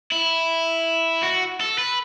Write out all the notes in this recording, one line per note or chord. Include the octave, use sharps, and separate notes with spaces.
E4
F#4
A4
B4